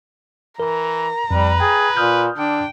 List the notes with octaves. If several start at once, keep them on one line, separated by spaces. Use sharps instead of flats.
E3 A#4 A#5
F2 G3 B4
G#4 G5
A#2 D#6 F6 G6
D3 D4 G5